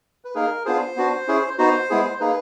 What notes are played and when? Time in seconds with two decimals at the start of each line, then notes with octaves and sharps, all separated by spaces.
0.25 B4
0.35 A#3 D#4 G#4 A#4
0.65 B3 D4 F4 G#4 C5
0.96 B3 D4 F#4
1.28 C#4 E4 G#4
1.58 B3 D#4 F#4 C5
1.90 G#3 B3 E4 G#4
2.20 A#3 D#4 G#4 B4